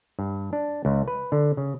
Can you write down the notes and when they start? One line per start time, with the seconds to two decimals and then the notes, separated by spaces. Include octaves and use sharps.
0.19 G2
0.53 D4
0.85 C#2
1.08 B4
1.32 D3
1.57 C#3